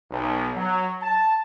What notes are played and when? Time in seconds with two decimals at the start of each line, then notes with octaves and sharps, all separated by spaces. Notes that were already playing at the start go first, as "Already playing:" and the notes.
0.11 B1
0.55 F#3
1.02 A5